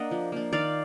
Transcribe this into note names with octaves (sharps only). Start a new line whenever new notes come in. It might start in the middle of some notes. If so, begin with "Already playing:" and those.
Already playing: A#3 D4 D#5 F#5
F3
A#3 D4
D#3 D5 F5